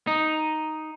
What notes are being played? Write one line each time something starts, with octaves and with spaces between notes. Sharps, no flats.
D#4